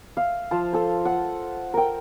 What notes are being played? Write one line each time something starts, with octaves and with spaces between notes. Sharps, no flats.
E5 F5
F3 C5 F5 A5
A4 C5
F#5
A#4 G5